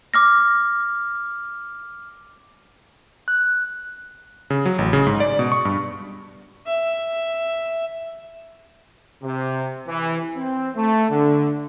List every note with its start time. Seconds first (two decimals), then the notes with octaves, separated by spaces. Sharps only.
0.14 D6 F6 A#6
3.28 F#6
4.50 C#3
4.65 F#3
4.79 A1
4.93 C#3
5.07 G#2
5.20 D5
5.39 B2
5.52 C#6
5.65 G2
6.67 E5
9.23 C3
9.88 E3
10.37 C4
10.75 A3
11.10 D3